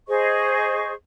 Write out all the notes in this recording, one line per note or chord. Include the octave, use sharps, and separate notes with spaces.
G#4 C5 D#5 C#6